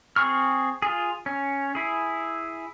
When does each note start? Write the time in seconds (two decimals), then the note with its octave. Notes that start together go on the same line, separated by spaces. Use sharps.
0.16 C4 G#4 C#6 F6
0.82 F4 G#4
1.26 C#4
1.75 E4 G#4